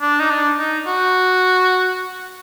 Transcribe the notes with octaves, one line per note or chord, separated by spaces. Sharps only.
D4
D#4
D4
D#4
F#4